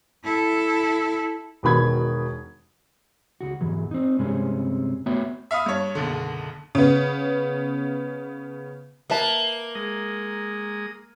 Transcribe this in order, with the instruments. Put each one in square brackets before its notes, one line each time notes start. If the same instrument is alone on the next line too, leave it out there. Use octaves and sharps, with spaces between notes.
[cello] E4 A4
[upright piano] E1 B2 D#3 B5 G#6
[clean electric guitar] C#2 F#4
E2 G#2 E3 F#3
C4 D#4
G2 C3 G#3 C4 C#4
A3 B3 F#4 C#5 E5 G5
[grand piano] E5 F5 B5 D#6
G2 C#5
F#1 B1 D3
[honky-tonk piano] C#3 B3
[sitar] A#3 [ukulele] B4 E5 A5
[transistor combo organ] G#3 A#5 D#6